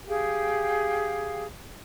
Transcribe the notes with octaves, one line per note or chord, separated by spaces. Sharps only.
G4 G#4 F5 G5